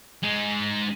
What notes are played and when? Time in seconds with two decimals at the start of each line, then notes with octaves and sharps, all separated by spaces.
0.23 G#3 D#4